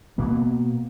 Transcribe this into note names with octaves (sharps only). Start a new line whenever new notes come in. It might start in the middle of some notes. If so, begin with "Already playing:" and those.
B2 A#3 B3